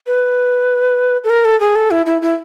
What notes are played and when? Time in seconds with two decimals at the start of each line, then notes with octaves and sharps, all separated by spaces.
0.07 B4
1.24 A4
1.30 A#4
1.45 A4
1.60 G#4
1.75 A4
1.91 E4
2.06 E4
2.22 E4